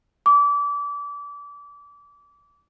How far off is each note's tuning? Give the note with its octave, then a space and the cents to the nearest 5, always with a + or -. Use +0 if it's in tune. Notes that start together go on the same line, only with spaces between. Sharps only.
D6 -30